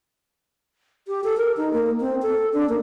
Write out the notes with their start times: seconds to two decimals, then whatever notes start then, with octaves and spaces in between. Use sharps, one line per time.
1.08 G4
1.24 A4
1.37 A#4
1.57 D#4
1.73 A#3
2.00 C4
2.22 A4
2.53 D4
2.69 A#3